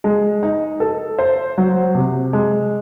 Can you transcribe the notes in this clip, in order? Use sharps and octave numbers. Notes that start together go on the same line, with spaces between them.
G#3
D#4
A4
C5
F#3
C3
G#3